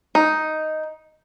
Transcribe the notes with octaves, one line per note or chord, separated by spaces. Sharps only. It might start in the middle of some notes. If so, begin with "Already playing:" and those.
D#4